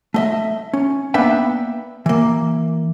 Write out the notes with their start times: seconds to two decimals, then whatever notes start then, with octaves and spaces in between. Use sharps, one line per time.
0.14 A3 D#5 E5
0.73 C#4
1.14 A#3 B3 D4 B4 E5 G5
2.06 E3 A#3